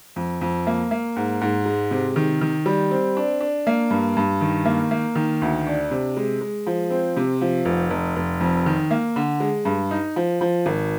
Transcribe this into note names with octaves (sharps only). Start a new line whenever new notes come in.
F2
F2
A#3
A#3
G#2
G#2
G#3
C3
D#3
D#3
G3
C4
D4
D4
A#3
G2
G2
D#3
A#3
A#3
D#3
D2
D4
C3
G#3
G#3
F3
C4
C3
F3
F1
F1
F1
F2
D#3
A#3
D3
G#3
G2
D#4
F3
F3
G#1